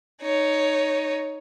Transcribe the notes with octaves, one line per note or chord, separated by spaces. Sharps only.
D#4 C#5